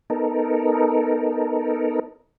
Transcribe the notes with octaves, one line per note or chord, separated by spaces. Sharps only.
B3 D#4 A4 A#4